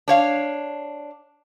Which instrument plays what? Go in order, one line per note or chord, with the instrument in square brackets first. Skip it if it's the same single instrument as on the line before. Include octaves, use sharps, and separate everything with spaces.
[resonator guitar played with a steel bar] D4 C#5 F5